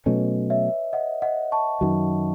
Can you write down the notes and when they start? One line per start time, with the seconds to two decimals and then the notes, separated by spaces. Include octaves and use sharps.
0.06 B2 F#3 A3 C#4 B4 D#5
0.50 C#5 E5
0.93 D#5 F#5
1.22 D#5 F#5
1.52 A5 C#6
1.81 F#2 D#3 F#3